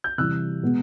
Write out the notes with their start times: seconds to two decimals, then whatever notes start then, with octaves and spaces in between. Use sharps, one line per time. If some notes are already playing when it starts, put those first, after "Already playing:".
0.04 G6
0.18 C3 E3 G3 E6 F#6
0.63 B2 G#3 B3